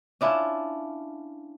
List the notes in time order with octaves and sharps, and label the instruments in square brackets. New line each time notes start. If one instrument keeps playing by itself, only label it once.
[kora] C#4 D4 E4 F4